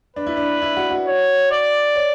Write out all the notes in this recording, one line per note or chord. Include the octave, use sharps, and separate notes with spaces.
D4 B4
E4
D4
E4
F#4
F#4
C#5
D5
C#5